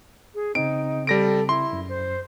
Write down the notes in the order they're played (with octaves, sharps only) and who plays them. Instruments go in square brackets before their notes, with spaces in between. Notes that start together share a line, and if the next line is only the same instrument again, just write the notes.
[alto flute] G#4
[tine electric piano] C#3 C4 [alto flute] D#4 [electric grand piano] D7
[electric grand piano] G3 A#6 D7 [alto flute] A4
[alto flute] E4 [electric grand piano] C6
[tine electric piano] F#2
[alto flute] C5